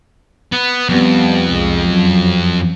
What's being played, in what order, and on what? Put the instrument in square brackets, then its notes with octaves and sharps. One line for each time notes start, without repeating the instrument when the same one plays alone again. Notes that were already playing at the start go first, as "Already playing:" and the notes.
[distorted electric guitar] B3
[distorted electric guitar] F2 [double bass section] G3 B3
[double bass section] C2 G#3
F#2 F#3